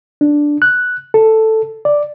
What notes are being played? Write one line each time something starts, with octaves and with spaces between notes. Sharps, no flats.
D4
F#6
A4
D5